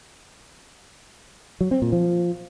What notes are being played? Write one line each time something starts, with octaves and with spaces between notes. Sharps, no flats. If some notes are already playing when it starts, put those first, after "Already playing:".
F#3
C4
A#2
F3